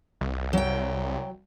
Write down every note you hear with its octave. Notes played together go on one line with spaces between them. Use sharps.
C2
F#3 G5